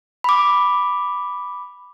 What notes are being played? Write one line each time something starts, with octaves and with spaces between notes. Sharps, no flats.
B5 D6